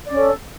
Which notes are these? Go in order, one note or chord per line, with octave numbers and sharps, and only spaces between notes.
C#4 A4 D5